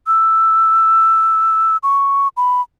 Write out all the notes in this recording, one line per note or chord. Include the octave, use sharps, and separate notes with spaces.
E6
C#6
B5